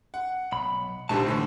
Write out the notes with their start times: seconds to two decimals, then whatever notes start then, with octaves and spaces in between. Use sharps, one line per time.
0.14 F#5
0.52 B1 B5
1.09 A#1 D3 G3 D#4 C5 A5
1.27 A2 D3 E3